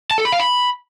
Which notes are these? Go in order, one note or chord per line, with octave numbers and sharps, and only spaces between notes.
A5
A4
B5
F5
B5